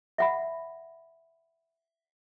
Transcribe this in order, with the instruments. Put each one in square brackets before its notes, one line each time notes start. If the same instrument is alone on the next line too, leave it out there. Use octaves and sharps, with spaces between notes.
[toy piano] E5 F#5 B5